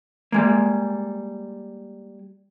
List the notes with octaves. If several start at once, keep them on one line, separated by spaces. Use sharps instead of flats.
G3 G#3 A#3